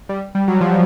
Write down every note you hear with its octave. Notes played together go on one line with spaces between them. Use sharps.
G3
G3
F#3
F3